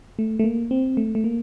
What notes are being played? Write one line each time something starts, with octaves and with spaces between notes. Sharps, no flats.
A3
A3
A#3
C4
A3
A3
A#3